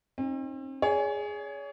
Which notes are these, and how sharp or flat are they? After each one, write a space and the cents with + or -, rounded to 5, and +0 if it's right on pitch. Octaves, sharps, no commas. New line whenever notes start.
C4 +40 D#4 -15
G#4 +0 C#5 +35